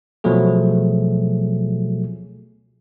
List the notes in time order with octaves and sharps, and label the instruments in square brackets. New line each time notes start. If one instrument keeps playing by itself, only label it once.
[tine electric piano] B2 F3 F#3 A3 G#4